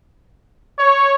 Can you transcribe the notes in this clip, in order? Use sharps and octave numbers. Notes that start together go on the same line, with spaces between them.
C#5